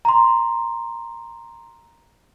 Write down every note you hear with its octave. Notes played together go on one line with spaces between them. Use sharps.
A#5 C6